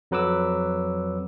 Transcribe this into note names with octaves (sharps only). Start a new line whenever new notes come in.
F2 F#3 B4 D6 E6